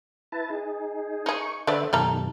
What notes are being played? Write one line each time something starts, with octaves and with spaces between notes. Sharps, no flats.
E4 B4 A5
D#4 G#4
D#4 G#4 C#6
D3 A3 B3 C5 D5 E5
F#2 B2 D#3 G3 A4 A#5